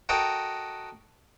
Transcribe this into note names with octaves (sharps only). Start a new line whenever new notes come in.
F#4 A4 A#4 D#5 G5